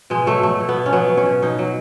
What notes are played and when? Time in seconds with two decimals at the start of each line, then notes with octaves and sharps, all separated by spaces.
0.10 B2 G#3
0.26 F#3 A3
0.43 F#3 A3
0.60 B2
0.69 B3
0.76 B2
0.86 C#4
0.92 F#3 B3
1.09 F#3
1.17 C#4
1.26 B2
1.42 B2 D#4
1.59 F#3